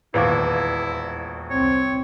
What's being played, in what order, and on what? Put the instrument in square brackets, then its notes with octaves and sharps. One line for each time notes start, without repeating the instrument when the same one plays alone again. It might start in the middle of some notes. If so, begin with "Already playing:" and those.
[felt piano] E1 A#1 D#2 [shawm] E4 [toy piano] B4 F5 D6
[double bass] C2 C4 [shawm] C#5